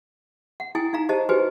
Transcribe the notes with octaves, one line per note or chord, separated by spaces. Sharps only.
F#5
E4 G5 G#5 D#6
D#4 F5 A#5
G4 C5 D#5 A5
F#4 G4 B4 C5 G#5